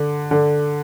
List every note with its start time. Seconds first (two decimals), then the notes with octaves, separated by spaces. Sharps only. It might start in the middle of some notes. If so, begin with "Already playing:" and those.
Already playing: D3
0.31 D3